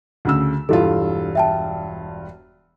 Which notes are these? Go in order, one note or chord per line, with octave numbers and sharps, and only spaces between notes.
D2 C#3 E6
E1 G2 E4 F4 G4 A4
E5 G5 A5